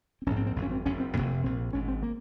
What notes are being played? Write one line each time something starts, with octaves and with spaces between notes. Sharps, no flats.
C4
A#1 G#2 C#4
C4
C4
G#1 F#2 C#3
C#4
C4
F#1 F#2 C#3 C#4
C4
F1 F2 C3 A#3
A#1 A#2 C4
G#1 G#2 C#4
C4
A#3